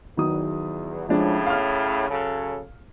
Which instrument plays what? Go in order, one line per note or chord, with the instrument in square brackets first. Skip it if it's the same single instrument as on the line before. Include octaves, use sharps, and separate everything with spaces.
[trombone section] E2 [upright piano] D#3 F#3 D#6
[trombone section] A2 C#3 [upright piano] F3 G#3 D4
[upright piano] F5 F6
[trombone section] C#3 F#3 A4